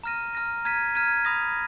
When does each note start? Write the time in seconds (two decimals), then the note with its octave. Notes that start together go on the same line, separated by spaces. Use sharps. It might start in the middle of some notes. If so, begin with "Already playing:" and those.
0.04 A#5 F6 A#6 D#7
0.33 A#5 F6 A#6 D#7
0.65 A#5 F6 G#6 B6 D#7
0.95 A#5 F6 G#6 B6 D#7
1.25 B5 D#6 A#6